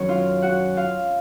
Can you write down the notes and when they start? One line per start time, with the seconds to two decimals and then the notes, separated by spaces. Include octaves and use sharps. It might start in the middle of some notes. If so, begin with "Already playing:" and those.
Already playing: F#2 D#3 F#3 C#4 C#5
0.09 F4 F5
0.42 F#4 F#5
0.77 F4 F5